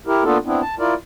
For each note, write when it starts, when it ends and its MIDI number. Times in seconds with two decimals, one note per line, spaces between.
0.07 0.24 64
0.07 0.24 67
0.07 0.24 70
0.24 0.38 58
0.24 0.38 59
0.24 0.38 62
0.24 0.38 65
0.24 0.38 69
0.46 0.61 59
0.46 0.61 60
0.46 0.61 62
0.46 0.61 64
0.61 0.75 81
0.79 0.94 64
0.79 0.94 65
0.79 0.94 70
0.79 0.94 74